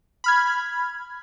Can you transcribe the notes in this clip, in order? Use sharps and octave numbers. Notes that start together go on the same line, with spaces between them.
B5 F6 G#6